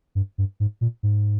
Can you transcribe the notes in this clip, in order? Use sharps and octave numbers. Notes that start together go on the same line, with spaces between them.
G2
G2
G#2
A#2
G#2